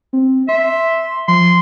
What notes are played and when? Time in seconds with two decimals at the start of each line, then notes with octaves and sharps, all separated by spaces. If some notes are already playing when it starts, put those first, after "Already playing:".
0.13 C4
0.49 E5 C6
1.28 F3 C6